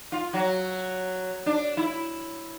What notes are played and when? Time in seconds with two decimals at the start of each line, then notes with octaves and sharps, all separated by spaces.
0.12 F4
0.33 F#3
1.46 D4
1.77 E4